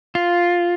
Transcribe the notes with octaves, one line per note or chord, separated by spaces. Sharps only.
F4